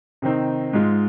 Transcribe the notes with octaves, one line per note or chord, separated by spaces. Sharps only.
C3 D#3 C4 D#4
G#2 G#3 F4